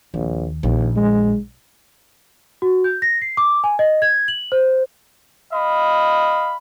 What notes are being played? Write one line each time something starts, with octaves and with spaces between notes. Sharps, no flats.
A#1 D#2
A#1 D#2
G#3
F#4
G6
A#6
C7
D6
G#5
D#5
G#6
F#7
C5
D#5 F5 B5